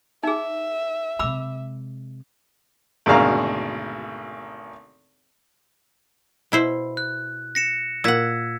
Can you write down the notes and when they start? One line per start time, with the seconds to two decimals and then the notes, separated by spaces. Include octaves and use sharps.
0.23 D#4 G#4 E5
1.19 C3 G#3 B5 D6 E6
3.06 G#1 D2 B2 G#4 F5 A#5
6.52 B2 E4 C5
6.97 F#6
7.55 A#6 C#7 E7
8.04 A#2 F#5 E6 G#6 B6